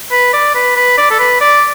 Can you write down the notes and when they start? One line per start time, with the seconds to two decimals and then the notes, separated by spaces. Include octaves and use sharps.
0.12 B4
0.33 D5
0.55 B4
0.76 B4
0.98 D5
1.11 A4
1.19 B4
1.41 D5